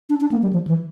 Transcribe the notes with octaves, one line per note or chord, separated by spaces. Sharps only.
D4
D4
A#3
G3
F3
E3